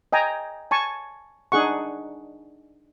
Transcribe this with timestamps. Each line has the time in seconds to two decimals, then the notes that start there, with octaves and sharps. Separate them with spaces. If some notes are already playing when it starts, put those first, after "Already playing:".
0.13 D#5 G5 G#5 A#5
0.71 G#5 A5 C#6
1.52 D4 D#4 G#4 F#5 C#6